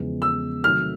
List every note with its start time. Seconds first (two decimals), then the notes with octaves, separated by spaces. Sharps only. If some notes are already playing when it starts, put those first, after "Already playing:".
Already playing: E2 C#3 F3 G#3
0.22 E6
0.64 C3 D#3 F#3 A3 F6